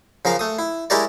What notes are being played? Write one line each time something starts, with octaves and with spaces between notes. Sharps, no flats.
C#3 F3 A#4 F5
A3 D#6
E4
G#3 E4 G4 A#4 C#5 D5